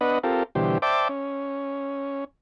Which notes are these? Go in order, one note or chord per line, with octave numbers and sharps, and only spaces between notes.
B3 D4 B4 D#5 F#5
C4 F4 G4 A4 A#4
B2 D3 E3 G3 G4 C5
C5 D5 E5 G5 A5 D6
C#4